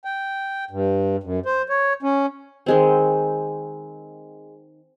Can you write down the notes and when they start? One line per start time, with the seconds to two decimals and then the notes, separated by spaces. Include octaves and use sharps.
0.05 G5
0.71 G2
1.23 F#2
1.46 C5
1.69 C#5
2.03 C#4
2.66 D#3 G#3 C4